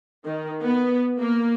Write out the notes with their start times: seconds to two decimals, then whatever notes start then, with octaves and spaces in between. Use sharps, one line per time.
0.25 D#3
0.63 B3
1.20 A#3